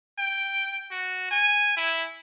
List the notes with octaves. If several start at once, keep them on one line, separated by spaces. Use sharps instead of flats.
G5
F#4
G#5
E4